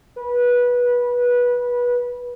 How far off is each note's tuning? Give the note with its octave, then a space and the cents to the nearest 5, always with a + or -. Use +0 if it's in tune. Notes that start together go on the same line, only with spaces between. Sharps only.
B4 -20